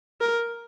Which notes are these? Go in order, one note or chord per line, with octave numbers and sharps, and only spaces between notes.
A#4